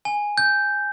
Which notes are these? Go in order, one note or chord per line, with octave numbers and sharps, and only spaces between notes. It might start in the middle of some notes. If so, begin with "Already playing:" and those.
G#5
G6